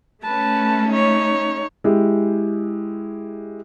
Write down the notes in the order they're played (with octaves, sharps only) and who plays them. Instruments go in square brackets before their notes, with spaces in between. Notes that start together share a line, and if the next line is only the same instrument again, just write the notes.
[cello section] A3 C#4 [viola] B4 A5
[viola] D#4 C#5
[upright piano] G#3 E4 G4